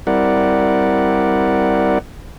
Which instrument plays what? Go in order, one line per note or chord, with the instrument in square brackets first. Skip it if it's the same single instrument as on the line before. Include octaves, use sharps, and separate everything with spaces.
[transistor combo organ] G3 C4 E4 A#4 D5 F#5